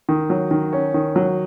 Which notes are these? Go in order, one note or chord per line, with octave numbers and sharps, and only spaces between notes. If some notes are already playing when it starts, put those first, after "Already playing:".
D#3
F#3
D#3
C#4
D#3
F#3